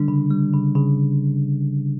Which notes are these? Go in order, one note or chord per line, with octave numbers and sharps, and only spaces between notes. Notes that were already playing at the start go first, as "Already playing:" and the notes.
Already playing: D3 G3 D4
C#3
G3
C#3
C#3